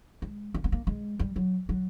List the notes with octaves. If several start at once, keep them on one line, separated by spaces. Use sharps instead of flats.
G#3
A#3
B3
A#3
G#3
G3
F#3
F#3